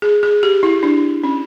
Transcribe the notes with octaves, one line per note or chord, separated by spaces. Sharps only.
G#4
G#4
G4
E4
D4
C#4